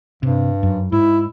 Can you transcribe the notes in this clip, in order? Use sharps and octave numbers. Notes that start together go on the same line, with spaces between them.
G2 C3
F#2
G#2 E4